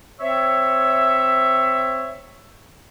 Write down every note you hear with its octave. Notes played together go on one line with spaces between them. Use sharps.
C4 C#5 E5